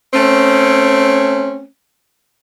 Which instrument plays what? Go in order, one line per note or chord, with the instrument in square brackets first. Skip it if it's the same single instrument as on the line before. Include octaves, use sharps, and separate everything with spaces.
[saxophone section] A3 C4 C#4